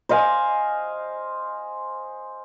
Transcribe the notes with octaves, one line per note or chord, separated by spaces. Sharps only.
C5 D#5 F5 G#5